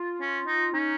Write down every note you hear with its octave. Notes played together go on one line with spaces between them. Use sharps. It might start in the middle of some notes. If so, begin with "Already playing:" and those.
Already playing: F4
C#4
D#4
C#4 D#4